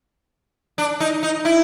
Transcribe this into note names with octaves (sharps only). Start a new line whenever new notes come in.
D4
D#4
D#4
E4